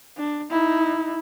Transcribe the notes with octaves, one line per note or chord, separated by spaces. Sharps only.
D4
D#4 E4